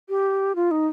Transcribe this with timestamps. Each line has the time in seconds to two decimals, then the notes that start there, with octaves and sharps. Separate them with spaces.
0.09 G4
0.55 F4
0.71 D#4